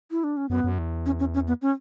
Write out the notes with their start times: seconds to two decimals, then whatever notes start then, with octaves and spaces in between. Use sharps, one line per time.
0.11 E4
0.24 D4
0.37 C#4
0.49 F#2 B3
0.64 F#2
0.78 E2
1.06 C#4
1.19 C#4
1.34 C#4
1.48 B3
1.62 C#4